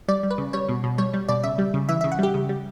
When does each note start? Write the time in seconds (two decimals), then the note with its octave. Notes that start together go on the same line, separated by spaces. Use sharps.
0.08 G3 D5
0.23 G3
0.31 B4
0.38 C#3
0.53 G3 C#5
0.69 B2
0.84 B2
0.98 G3 C#5
1.14 G3
1.29 B2 D5
1.43 C#3 E5
1.58 G3
1.74 C#3
1.89 E3 E5
2.01 C#3 E5
2.12 F#5
2.19 G3 G4
2.34 C#3
2.49 G3